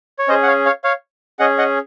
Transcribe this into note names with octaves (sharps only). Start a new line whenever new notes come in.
C#5
C#4 G#4 C5 D#5
F#5
C#5 F5
C#5 F5
C#5 F5
C#4 G#4 D#5 F#5
D#5 F#5